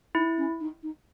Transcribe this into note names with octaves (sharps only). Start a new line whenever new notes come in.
D#4 E4
C#4
D#4
D#4